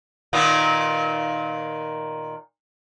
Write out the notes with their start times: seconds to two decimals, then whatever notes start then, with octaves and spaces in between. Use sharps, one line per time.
0.33 A#2 D#3 B3